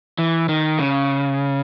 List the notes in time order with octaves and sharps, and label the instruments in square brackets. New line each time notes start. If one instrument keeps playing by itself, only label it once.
[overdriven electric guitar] E3
D#3
C#3